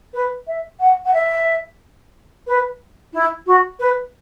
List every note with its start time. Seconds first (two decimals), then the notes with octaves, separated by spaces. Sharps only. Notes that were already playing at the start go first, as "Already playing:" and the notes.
0.13 B4
0.47 E5
0.79 F#5
1.04 F#5
1.13 E5
2.47 B4
3.13 E4
3.46 F#4
3.79 B4